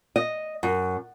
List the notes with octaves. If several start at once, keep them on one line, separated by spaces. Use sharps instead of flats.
D#5
F#2